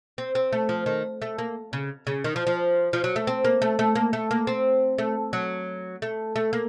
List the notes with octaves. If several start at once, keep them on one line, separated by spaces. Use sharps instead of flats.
C4
C4
A3
F3
D#3
A3
A#3
C#3
C#3
D#3
F3
F3
F3
F#3
A3
C4
A#3
A3
A3
A#3
A3
A#3
C4
A3
F#3
A3
A3
A#3